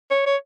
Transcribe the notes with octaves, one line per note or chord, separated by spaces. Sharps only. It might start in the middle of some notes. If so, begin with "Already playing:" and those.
C#5
C#5